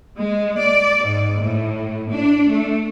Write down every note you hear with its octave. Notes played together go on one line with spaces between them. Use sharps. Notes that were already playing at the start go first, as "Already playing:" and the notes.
G#3
D5
G#2
A2
D4
A3